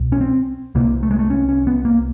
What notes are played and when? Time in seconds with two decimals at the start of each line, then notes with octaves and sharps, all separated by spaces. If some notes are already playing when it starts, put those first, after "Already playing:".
Already playing: C2 B2
0.12 C#4
0.21 C4
0.75 C2 C3 A#3
1.03 A3
1.11 G#3
1.19 A3
1.30 C#4
1.49 C#4
1.67 B3
1.85 A#3